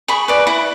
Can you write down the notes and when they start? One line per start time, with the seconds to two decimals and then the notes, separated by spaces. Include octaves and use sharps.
0.08 G#4 B5 C#6
0.28 B4 D5
0.47 E4